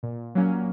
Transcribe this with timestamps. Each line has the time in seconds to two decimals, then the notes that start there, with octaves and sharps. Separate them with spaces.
0.03 A#2
0.35 F#3 A#3 C#4